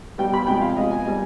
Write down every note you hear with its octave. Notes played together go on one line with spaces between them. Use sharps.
B2 G3 G5
B5
C3 F3 G#3 G5
F5
B2 G#3 D#5
G#5
B2 G3 G#5